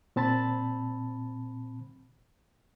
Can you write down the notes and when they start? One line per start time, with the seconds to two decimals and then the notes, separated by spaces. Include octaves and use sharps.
0.16 A#2 C4 A5 B5 A6